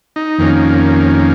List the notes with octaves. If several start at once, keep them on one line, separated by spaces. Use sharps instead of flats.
D#4
F2 D#3 A#3 C#4